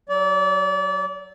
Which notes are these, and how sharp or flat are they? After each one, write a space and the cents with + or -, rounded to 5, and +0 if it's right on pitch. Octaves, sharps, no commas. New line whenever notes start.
F#3 +5 D5 -30